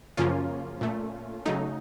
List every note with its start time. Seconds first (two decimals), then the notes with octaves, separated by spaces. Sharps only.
0.17 F#2 C#3 F3 A#3 C#4 F4
0.81 A#2 A3
1.45 C#3 F#3 A3 D#4